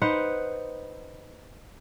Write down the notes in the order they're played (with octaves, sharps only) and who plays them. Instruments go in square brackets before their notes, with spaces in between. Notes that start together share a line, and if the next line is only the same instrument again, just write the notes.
[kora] D#4 B4 C5 F#5